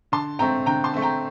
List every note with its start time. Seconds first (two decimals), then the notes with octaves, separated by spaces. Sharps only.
0.12 D3 A5 C6
0.39 A3 C4 G5 A#5
0.66 D3 G5 A#5
0.84 A5 C6
0.94 A3 C4
1.02 G5 A#5